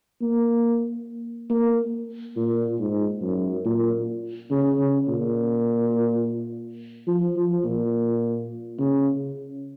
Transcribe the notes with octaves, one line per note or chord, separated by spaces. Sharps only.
A#3
A#3
A#2
G#2
F#2
A#2
C#3
C#3
A#2
F3
F3
A#2
C#3